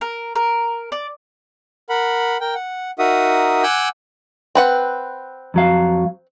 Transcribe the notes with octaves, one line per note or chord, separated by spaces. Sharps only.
A#4
A#4
D5
A#4 F#5 B5
A#4 G5
F#5
D#4 F#4 A#4 E5 F#5 D#6
F#5 G#5 D6 E6 F#6 G6
C4 B4 F#5
F2 F#3 F5